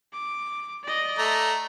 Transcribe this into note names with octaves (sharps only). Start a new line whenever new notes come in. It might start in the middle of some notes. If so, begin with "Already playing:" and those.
D6
D5 D#5
A3 A#5